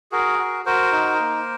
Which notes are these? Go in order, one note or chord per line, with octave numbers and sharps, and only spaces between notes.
F#4 G#4 A#4
F#4
F#4 A#4 C5
D#4
A#3